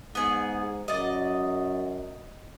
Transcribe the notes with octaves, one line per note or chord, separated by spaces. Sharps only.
G#2 B3 G#4
F#2 D5 D#5